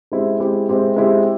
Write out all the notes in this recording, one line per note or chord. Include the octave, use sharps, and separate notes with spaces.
G#3 C4 E4 G4
G#3 C4 E4 G4
G#3 C4 E4 G4
G#3 C4 E4 G4